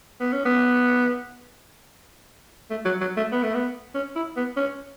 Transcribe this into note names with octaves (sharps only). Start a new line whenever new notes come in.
B3
C#4
B3
A3
F#3
F#3
A3
B3
A3
B3
C#4
E4
B3
C#4